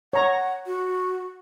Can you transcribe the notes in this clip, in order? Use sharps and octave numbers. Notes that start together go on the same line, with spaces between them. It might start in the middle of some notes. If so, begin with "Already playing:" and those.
C#5 F#5 A#5 C#6
F#4